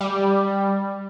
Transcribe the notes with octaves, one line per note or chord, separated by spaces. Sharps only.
G3